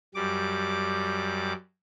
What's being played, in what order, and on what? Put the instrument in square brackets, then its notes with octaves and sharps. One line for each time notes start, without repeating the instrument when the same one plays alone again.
[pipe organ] F#2 G3 D6